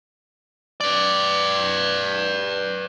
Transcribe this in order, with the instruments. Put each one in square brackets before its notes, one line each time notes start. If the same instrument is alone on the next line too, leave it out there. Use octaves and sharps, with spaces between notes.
[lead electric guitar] B4 D5